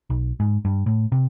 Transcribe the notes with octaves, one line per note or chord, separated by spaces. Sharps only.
B1
G#2
G2
A2
C3